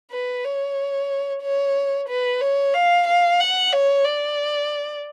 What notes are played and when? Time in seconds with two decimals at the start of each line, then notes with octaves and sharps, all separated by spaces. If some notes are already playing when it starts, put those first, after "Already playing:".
0.12 B4
0.44 C#5
1.42 C#5
2.09 B4
2.41 C#5
2.74 F5
3.07 F5
3.40 F#5
3.73 C#5
4.05 D5